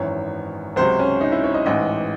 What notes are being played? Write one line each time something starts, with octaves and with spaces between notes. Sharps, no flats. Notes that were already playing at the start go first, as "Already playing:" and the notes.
Already playing: G#1 F#2 E3 C#5
C#2 C3 F#3 C5
C#4
D#4
E4
C#5
D#5
A1 G#2 E3 D#5